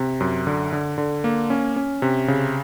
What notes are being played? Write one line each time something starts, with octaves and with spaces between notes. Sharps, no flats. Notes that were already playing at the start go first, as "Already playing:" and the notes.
Already playing: C3
F#2
D3
D3
D3
A#3
C#4
C#4
C3
C#3